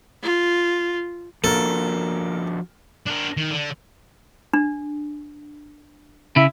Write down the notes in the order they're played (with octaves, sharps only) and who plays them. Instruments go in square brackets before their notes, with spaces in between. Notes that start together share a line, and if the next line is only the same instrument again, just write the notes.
[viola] F4
[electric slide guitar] F3 D4 F#4 [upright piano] A#3 A#4 [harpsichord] A4
[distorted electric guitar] D4 A#4
D#3
D3
[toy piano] D4
[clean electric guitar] C#3 [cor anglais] E4